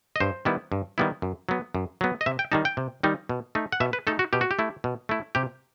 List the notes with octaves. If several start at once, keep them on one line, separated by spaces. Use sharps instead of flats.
D#5
G2 C5
D#3 G3 B3 E4
G2
D#3 G3 B3 E4
F#2
F#3 B3
F#2
F#3 B3
D#5
C3 E5
G5
D#3 G3 D#4 A5
G5
C3
D#3 G3 D#4
B2
A3 D#4
F#5
B2 E5
B4
A3 D#4 A4
F#4
B2 G4
F#4
G4
A3 E4
B2
A3 E4
C3 G4